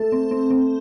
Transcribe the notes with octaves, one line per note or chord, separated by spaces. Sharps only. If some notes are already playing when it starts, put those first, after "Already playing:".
Already playing: A3 A4
C4
C4
C4